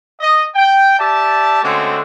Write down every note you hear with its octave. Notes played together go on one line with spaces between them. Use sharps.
D#5
G5
G4 D5 E5 A5
D3 G#3 A3 C4 C#4 F#4